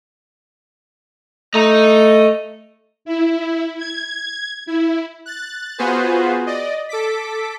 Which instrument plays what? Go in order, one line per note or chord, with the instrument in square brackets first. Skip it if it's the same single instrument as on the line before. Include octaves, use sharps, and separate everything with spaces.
[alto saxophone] A3 [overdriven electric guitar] D#5 A#5
[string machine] E4
G#6
E4
[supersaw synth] F#6 A6
B3 F4 F#4 G#4 B4 C5
D5 D#5
A4 D6 B6